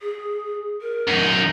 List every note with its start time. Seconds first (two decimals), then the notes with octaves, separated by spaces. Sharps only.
0.01 G#4
0.82 A#4
1.08 F#2 D#4